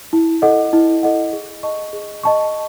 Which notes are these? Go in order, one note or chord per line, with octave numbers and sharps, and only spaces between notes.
E4
A4 D#5 F#5
E4
A4 D#5 F#5
G#4
D#5 A5 C#6
G#4
D#5 A5 C#6